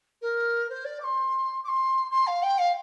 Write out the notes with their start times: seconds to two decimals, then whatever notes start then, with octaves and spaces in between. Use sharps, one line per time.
0.22 A#4
0.70 C5
0.85 D5
1.00 D6
1.04 C6
1.64 D6
1.68 C6
2.11 C6
2.27 F5
2.43 G5
2.58 F5